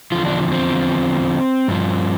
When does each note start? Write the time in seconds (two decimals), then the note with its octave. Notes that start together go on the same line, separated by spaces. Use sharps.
0.12 E2 D3 F3 F4
0.25 D4
0.52 C4
1.68 G2 F3